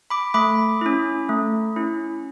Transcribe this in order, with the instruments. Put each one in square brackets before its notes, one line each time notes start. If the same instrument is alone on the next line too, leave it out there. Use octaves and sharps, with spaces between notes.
[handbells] B5 D6
A3 B5 D6
C#4 E4
A3
C#4 E4